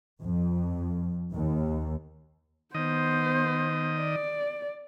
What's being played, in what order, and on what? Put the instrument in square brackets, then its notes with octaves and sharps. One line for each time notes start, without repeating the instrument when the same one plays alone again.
[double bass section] F2
D#2
[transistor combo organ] D#3 D#5 [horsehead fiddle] B3 C5
[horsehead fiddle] D5